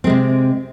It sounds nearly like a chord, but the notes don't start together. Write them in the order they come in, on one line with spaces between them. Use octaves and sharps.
C4 G#3 C3